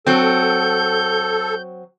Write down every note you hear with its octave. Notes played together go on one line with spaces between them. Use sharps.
F#3 C4 A4 G6